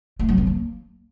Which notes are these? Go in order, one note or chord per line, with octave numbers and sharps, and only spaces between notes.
A3
F#3
B3
A#3